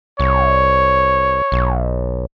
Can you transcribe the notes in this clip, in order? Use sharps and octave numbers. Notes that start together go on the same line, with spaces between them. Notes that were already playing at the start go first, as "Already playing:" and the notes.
C2 C#5
B1